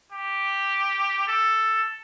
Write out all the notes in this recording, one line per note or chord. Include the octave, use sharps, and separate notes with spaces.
G4
A4